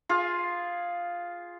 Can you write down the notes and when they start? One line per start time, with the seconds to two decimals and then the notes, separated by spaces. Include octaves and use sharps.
0.09 F4 G#4